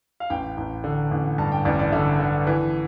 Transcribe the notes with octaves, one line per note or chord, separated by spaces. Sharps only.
F5
A1 G5
A1
D3
A1
G2 A5
G5
A1 D5
D5
D3 E5
D3
E3